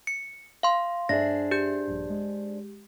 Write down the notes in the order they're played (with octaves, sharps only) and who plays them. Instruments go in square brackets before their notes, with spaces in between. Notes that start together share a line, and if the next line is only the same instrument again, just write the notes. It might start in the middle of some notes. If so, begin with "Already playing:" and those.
[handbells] C#7
F5 C6
[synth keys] G2 E5 [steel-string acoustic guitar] D4 G#4 C5 [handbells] A#6
[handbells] G4 G6
[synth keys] A#1 G2
G#3